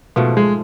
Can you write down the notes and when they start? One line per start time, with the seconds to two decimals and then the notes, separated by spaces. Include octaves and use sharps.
0.16 G#2 B2 F3 A3 F4
0.37 G#3